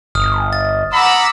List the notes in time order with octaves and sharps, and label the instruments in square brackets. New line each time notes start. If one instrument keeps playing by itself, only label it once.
[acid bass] G1 [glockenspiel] D#6 F6
[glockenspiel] A6
[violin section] F#5 D6 E6 [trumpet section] A#5 B5